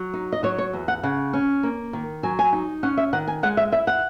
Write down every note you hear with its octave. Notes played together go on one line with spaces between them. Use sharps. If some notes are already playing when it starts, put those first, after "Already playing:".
Already playing: F#3
D#4
D#5
F#3 C#5
C#5
E2
F#5
C#3 F#5
C#4
A#3
D#3
F#3 G#5
G#5
D#4
C#4 F#5
E5
D#3 F#5
G#5
G#3 F#5
E5
E4 E5
F#5